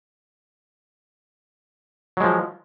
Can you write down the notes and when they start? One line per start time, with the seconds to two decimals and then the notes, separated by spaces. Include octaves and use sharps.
2.17 F#3
2.20 G#3
2.24 F3